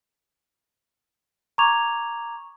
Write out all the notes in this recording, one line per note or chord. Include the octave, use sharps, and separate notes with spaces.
A#5 C#6 D6 G#6 F7